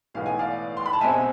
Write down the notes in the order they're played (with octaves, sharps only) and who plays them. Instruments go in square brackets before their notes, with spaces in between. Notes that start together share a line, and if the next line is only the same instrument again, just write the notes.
[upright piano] B1 A2 E3 G#3 B3 F5
G#5
D5 F5
C6
B5
A5
C2 B2 G#3 C4 E5 G#5